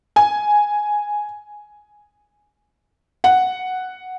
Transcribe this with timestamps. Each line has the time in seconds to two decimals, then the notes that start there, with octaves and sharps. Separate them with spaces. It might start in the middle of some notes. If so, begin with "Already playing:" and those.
0.16 G#5
3.24 F#5